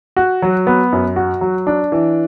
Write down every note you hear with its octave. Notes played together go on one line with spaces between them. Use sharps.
F#4
F#3
B3
F#2
F#4
F#3
D4
E3